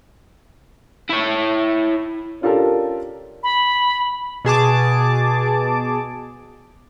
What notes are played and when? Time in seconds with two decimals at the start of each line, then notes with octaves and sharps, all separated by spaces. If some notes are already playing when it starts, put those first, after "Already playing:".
1.09 E4 C#5
2.41 C#4 D4 F4 G4 A4 A#4
3.43 B5
4.45 B2 G#4 A5 D6